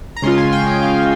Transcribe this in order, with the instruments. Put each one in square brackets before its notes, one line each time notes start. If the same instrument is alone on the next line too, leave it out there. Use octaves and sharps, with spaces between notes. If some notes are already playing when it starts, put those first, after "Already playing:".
[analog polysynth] A#5
C#3 G#3 C#4 F4 C6
G#5
G5
D#5
F5